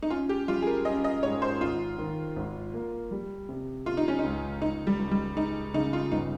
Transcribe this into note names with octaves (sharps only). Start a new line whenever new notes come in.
D#4
C#4 F4
G4
G3 F4
G#4
A#4
C#4 D#5
D#5
G#2 C#5
C5
G#1 F4
D#3
G#1
A#3
G3
C3
C3 F4
D#4
C#4
D#4
C#2
C#2 D#4
G3
C#2
G3
G#3 D#4
C#3 D#4
F4
G1 D#4